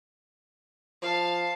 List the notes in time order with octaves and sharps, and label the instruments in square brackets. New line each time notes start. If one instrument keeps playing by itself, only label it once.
[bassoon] F3 [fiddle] F5 A5